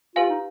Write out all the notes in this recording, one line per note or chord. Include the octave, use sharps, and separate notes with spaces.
F4 G4 B4 F5 G#5
D#4